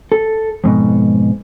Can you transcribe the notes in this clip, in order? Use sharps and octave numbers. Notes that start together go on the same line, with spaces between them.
A4
F2 G#2 B2